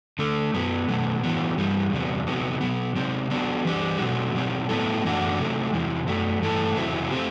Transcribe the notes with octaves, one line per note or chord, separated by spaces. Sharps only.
D3 A3 D4
F#2 F#3 B3
B2 F#3 A3
A2 E3 B3 F#4
G2 E3 G3
E2 C3 G3 B3
C3 F#3 B3
B2 F#3 B3
C3 F#3 C4
F#3 B3 D4 F#4
E3 G3 D4 G4
B2 F#3 A3 C4 F#4
B2 F#3 C4 G4
A2 F#3 B3 E4 A4
F#2 E3 A3 D4 F#4
C3 F#3 A3
E2 C3 E3
F#2 F#3 A3
G2 E3 A3 E4 A4
E2 C3 F#3 C4 E4
B2 A3 C4 G4